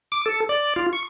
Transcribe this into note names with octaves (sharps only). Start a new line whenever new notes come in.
D6
A4
D5
F4
C#6